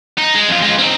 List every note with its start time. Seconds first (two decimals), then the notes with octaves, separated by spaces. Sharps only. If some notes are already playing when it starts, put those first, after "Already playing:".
0.18 D#4
0.35 G#3
0.49 F2 F4
0.62 G#3 F4
0.79 C4 D#4